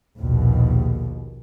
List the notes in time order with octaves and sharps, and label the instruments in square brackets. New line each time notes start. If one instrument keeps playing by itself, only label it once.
[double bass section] A#1 D#2 B2